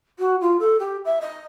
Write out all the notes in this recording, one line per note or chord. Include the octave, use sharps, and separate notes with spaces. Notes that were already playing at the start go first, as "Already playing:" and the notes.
F#4
F4
A4
G4
E5
D#5